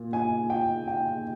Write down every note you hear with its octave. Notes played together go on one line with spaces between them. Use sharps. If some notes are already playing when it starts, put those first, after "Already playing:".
Already playing: A#2
G#5
G5
G5